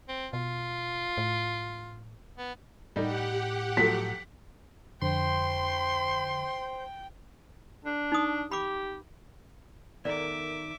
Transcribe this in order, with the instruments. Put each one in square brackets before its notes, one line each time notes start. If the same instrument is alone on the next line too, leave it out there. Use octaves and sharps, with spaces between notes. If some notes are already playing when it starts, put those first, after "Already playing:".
[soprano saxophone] C4
[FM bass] B2 [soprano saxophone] F4
[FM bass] A2
[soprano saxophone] B3
[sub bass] A2 [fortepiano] G3 D#4 [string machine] G4 F#5
[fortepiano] F3 F#3 A3 [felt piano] B6
[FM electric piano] F2 D3 [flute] C5 [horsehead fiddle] G5 [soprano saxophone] C6
[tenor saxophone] D4
[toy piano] D#4 D#6
[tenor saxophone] G4 [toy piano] B5 D6
[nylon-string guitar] D#3 [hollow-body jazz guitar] B3 A4 A#4 [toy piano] D5 [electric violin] E5 D6